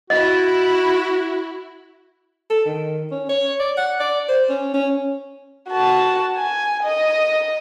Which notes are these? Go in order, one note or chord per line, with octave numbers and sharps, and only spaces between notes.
E4 F#4 D#5
A4
D#3
C#4
C#5
D5
F#5
D5
C5
C#4
C#4
F#4 A5
G#5
D#5